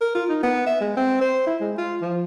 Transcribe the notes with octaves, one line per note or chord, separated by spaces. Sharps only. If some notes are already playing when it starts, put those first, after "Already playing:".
A#4
F4
D#4
B3
E5
G#3
C4
C5
E4
G#3
F4
F3